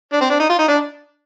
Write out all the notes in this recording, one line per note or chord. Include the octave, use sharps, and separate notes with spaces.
D4
C4
D4
D#4
F4
D#4
D4